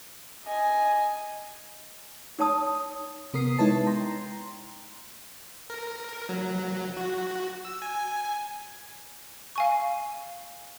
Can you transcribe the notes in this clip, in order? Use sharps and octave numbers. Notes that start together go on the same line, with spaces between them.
D#5 G#5
D#4 C#5 A5 D#6
C3 B3 A#4 D#6 C7
G#3 D#4 E4 B4 C#5 A5
G5 A#5 C6
A#4
F#3
F#4
E6
G#5
F5 G#5 C#6